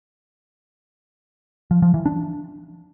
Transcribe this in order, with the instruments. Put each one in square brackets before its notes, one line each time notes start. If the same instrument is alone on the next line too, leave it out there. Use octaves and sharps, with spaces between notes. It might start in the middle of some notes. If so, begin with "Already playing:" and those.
[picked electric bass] F3
F3
E3
D4